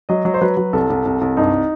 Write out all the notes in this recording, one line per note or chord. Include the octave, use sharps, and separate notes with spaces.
F#3 D#5
F#3
C5
F#3 B4
F#3
C2 A4
C2
C2
C2
G2 D#4